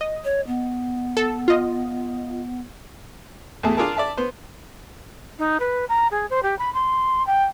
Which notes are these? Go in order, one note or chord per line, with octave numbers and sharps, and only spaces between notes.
D#5
C#5
B3
A4
F4 D#5
E2 A2 A3 E4 G#4 A5
D4 F4 G#4 A#4 A5
D5 E5 A5
B3 C5
D#4
B4
A#5
G#4
C5
G4
B5
C6
G5